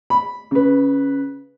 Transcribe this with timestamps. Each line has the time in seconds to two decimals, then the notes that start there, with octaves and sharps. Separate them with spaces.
0.10 B5
0.51 C#3 B4